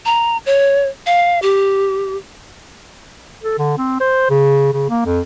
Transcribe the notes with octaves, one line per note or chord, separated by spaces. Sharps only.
A#5
C#5
F5
G4
A4
D3
C4
C5
C#3
C#3
A#3
F2